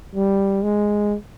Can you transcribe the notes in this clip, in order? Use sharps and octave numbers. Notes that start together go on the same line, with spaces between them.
G3
G#3